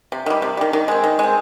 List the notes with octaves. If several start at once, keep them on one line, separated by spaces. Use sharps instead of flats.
C3
D#3 G3
C3
D#3 G3
D#3
G#3 C4
D#3
G#3 C4